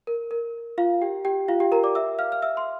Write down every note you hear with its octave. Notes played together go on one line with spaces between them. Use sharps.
A#4
A#4
F4 F5
G4 G5
G4 G5
F4 F5
G4 G5
A#4 A#5
D5 D6
E5 E6
F5 F6
F6
E5 E6
C6